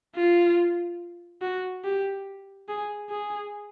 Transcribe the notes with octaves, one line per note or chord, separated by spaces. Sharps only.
F4
F#4
G4
G#4
G#4